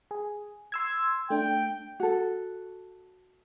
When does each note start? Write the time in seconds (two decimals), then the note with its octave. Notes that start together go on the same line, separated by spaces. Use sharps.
0.11 G#4
0.72 C6 E6 G#6
1.30 A3 D4 G5
2.00 F#4 A4